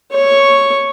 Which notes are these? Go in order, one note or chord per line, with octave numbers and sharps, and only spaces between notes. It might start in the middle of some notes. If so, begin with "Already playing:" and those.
C#5 C#6